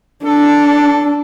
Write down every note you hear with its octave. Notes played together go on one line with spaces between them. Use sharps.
D4 A4